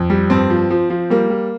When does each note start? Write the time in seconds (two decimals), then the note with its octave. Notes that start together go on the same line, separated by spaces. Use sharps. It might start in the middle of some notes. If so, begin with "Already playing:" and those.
Already playing: F2
0.10 G3
0.30 G2 C4
0.50 F3
0.70 F3
0.90 F3
1.10 G3 A#3
1.30 G3